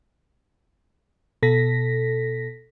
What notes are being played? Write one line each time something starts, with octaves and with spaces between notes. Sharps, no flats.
B2 A4 A#6 B6